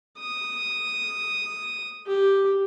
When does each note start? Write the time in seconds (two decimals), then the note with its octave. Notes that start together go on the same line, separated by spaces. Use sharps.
0.18 D#6
2.06 G4